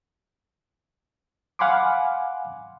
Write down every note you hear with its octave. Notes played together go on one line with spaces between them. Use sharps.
F5 F#5 G#5 B5 C6 D6